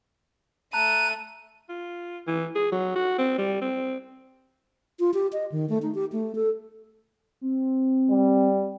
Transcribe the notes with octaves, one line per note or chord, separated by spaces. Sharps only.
A3 A5 A#5 F#6 D#7
F4
E3
G#4
F#3
F#4
C4
G3
C4
F4
G4
D#5
D#3
A3
D#4
G4
A3
A4
C4
G3